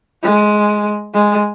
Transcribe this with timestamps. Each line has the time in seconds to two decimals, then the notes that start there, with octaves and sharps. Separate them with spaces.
0.23 G#3
1.14 G#3